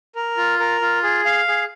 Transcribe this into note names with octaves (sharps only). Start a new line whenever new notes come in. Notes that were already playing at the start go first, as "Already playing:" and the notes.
A#4
F4
A#4
F4
G#4
F5
G#4